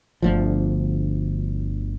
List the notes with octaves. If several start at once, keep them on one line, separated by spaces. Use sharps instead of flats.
G1 D2 F3